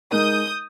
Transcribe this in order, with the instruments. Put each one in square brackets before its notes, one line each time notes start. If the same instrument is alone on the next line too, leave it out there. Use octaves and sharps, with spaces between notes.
[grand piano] G#3 D#4 A#4 D#5 [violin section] D#6 G6